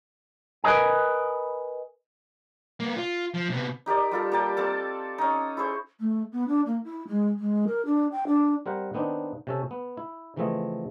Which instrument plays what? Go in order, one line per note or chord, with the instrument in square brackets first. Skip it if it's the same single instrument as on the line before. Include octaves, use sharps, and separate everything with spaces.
[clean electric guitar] A#4 B4 C#5 D#5 G#5
[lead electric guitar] A#3 B3
F4
F3
C3 B3
[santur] D#4 G4 A#4 D5
G3 F4 A4
A#3 G4 G5 A5
C4 A4 A5
C#4 D#4
E4 G#4 C5 C#6
[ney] A3
B3
D4
A#3
E4
G#3
G#3
A#4
D4
G5
D4
[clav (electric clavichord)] G3 C4 A#4 C5 F#5
D#3 B3 C4 D4 D#4
C3 C#4 A4
B3
E4
C#3 E3 F3 A3 C4 D#5